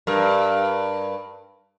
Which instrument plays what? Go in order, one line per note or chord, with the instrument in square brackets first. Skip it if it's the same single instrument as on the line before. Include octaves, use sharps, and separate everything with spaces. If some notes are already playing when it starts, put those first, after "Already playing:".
[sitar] G2 A#4